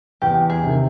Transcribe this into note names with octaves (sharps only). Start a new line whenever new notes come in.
E2 G4
G#4
C3 D#3